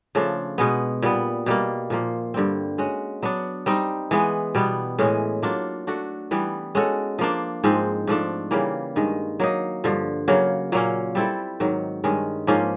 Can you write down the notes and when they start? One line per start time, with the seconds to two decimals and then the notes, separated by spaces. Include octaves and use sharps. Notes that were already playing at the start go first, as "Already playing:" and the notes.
0.15 C#3 F3 A3 D4
0.58 B2 G#3 B3
1.02 A#2 G3 B3
1.46 B2 G3 A#3
1.90 A#2 F3 A#3
2.34 G2 D3 G3 C4
2.78 G#3 C#4 F#4
3.22 F#3 B3 D4
3.66 G3 C4 D#4
4.11 E3 G#3 B3
4.55 B2 G3 B3
4.99 A2 E3 G#3 C#4
5.42 F#3 A#3 D4 F4
5.87 A3 D4 F#4
6.31 E3 G3 B3
6.75 G#3 C#4 F#4 A4
7.19 F3 A#3 D4
7.64 G#2 F3 G#3 C4
8.07 G#2 F3 A3 D4
8.51 C#3 E3 G3 A#3
8.96 G2 D#3 G#3
9.40 F#3 A#3 D#4
9.84 G2 D3 F3
10.28 C#3 F#3 A#3
10.72 A#2 F#3 A#3 C#4
11.15 G3 C4 E4 A4
11.60 G#2 D#3 F#3
12.04 G2 D#3 G#3 C#4
12.47 G#2 F3 A#3 C#4